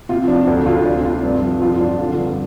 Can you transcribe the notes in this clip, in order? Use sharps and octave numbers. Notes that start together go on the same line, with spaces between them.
C3 F4
F3 D4
D2 D4
D2 F4
C3 D4
C3 F4
G2 D4
F3
F2 F4
F4
F2 D4
D3 F4
G2